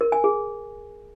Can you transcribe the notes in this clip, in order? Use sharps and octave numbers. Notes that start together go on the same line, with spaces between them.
A#4
G#5
G#4